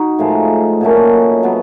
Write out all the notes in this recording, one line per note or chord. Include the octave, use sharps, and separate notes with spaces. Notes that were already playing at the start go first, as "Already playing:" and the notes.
Already playing: D#4 F#4
A2 F3 G#3
A#2 F#3 A3 C#4
F#3 B3